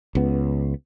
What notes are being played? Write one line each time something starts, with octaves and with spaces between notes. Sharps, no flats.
C#2 B3